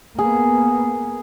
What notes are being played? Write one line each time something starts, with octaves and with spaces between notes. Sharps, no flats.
A#3 B3 G#4